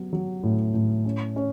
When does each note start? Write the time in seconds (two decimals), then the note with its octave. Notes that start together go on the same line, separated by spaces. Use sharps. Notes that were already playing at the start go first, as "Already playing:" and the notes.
Already playing: F#3 B3
0.13 F#3
0.43 A2
0.74 A2
1.05 C#4
1.36 C#4